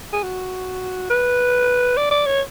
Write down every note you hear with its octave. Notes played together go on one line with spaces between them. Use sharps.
G#4
F#4
B4
D5
D5
C#5